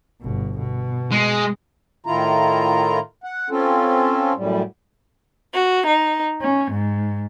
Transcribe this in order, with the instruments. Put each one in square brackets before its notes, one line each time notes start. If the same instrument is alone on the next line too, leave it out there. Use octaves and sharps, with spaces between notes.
[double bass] G1 B2
B2
[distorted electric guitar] G#3
[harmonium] A2 D#3 E4 F4 A#5
F#5
C4 C#4 F4 A4
F#2 A2 G3
[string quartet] F#4
D#4
C#4
G#2